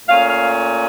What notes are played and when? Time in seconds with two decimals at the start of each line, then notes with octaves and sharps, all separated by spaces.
0.08 A#2 A3 C#4 F5
0.29 F5